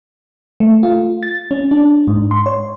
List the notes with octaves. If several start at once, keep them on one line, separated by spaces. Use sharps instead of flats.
A3
F4
A6
C#4
D4
G#2
C6
C#5